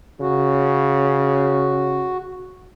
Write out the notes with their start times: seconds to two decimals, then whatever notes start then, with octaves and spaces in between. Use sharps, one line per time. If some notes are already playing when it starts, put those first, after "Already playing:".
0.21 C#3 F#4